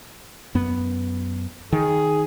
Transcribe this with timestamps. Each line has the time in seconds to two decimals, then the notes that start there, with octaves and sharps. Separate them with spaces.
0.55 F#2 B3
1.73 D#3 G#4